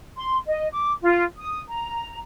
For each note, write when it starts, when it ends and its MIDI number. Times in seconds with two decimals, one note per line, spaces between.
0.17 0.36 84
0.47 0.67 75
0.72 0.91 86
1.02 1.23 65
1.37 1.59 87
1.69 2.19 82